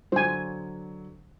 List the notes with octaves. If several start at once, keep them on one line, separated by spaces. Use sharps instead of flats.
D3 F#3 F#4 C5 G#5